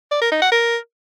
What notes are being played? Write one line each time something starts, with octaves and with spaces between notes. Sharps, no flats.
D5
A#4
D#4
F#5
A#4